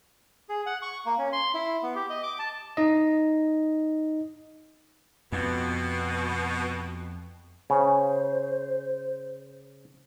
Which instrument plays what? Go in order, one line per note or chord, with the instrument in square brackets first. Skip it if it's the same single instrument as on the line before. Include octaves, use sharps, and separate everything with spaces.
[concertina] G#4
F#5
C#6
A#3
C#4
C6
E4
B3
G4
D#5
D6
A5
[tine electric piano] D#4 D#5
[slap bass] F2 [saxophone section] B2
[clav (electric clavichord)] C#3 [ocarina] C5